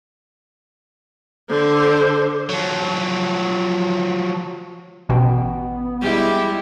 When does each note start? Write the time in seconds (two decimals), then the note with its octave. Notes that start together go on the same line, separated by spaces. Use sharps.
1.50 D3 C5
2.49 F3 F#3
5.09 A1 B2 B3 G5
6.01 G3 G#3 E4 G4